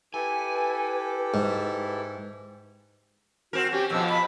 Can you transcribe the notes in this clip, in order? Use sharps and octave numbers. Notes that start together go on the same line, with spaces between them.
E4 G4 A4 B4 G#5
G#2
C4 F#4 A#4
C#4 G4
F2 B2 F3 E6
B5